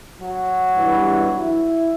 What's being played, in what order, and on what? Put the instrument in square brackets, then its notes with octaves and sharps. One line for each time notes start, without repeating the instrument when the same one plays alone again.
[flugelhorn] F#3
[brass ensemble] B1 G2 E3
E4 E5